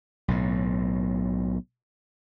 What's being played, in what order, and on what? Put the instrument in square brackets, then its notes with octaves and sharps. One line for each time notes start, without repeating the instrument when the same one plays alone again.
[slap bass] B1 A2